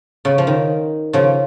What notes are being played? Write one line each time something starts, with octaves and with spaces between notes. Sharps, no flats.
C#3
F3
D#3
C#3 F3